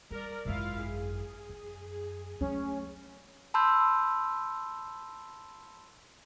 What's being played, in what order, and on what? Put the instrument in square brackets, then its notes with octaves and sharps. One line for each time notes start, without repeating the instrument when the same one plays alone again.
[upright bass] G3 [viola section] A#4 D5
[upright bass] G#1 F#2 [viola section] E4 F4 F5
[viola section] G#4
[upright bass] F#2
[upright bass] F#3 A3 [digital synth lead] C#4
[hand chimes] A5 B5 C6 E6 G6